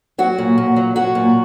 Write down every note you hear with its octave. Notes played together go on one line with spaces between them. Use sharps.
F#3 F#4
A#2
A#2
F#3
F#3 F#4
A#2